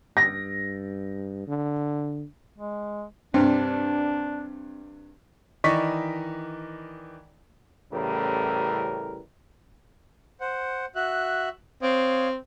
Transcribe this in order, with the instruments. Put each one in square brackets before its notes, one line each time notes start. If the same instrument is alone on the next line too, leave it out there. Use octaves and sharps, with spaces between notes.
[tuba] G2 [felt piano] A#6
[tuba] D3
[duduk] G#3
[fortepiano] G2 C3 [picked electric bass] C4 [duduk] D4
[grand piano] D#3 E3 D5 D#5 C#6 B6
[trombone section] A1 A2 C#3 E3 G3 A#4
[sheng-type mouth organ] C5 F#5
F#4 E5 F#6
[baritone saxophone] C4 [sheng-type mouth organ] C#5 F5 D#6